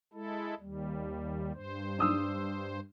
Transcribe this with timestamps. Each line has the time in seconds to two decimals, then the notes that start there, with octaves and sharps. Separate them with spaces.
0.13 G#3 E4 A4
0.60 D#2 G3
1.54 G2 C5
1.98 D4 D#6 E6